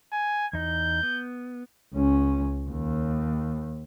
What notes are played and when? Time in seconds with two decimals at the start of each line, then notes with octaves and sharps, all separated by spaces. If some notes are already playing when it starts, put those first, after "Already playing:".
0.12 G#5
0.53 E2 D#4 G6
1.03 B3
1.93 C#2 C#4
2.70 D#2